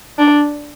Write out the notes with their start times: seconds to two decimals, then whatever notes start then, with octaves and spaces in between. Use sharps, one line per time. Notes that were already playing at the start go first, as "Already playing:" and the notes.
0.19 D4